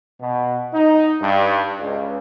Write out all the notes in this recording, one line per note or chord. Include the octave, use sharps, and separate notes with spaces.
B2
D#4
G2
C#2